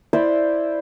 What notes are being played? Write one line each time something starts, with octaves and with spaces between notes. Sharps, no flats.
E4 C5 D5 E5